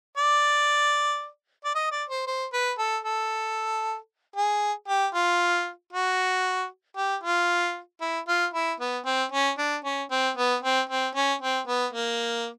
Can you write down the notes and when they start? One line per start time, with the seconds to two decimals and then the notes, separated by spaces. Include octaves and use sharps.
0.18 D5
1.65 D5
1.75 D#5
1.92 D5
2.10 C5
2.27 C5
2.53 B4
2.79 A4
3.05 A4
4.36 G#4
4.88 G4
5.14 F4
5.93 F#4
6.97 G4
7.24 F4
8.01 E4
8.28 F4
8.54 E4
8.80 B3
9.06 C4
9.32 C#4
9.58 D4
9.85 C#4
10.11 C4
10.37 B3
10.63 C4
10.90 C4
11.15 C#4
11.42 C4
11.68 B3
11.93 A#3